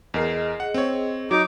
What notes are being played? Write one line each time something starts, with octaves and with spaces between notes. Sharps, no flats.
E2 G#4 A#4 D#5 C7
F#5
C4 C#5
F#3 D#4 F#4 D6